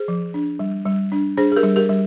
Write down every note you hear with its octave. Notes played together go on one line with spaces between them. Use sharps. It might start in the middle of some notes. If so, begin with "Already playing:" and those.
Already playing: G#4 C5
F3
D4
G3
G3
D4
D4 G#4 C5
G#4
G4 A#4
G3
G4 A#4
G3